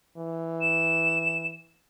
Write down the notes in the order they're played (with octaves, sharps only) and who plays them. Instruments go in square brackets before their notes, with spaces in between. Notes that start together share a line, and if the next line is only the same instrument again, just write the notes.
[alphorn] E3
[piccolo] E7